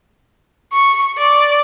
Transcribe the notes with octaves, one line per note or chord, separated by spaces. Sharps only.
C#6
D5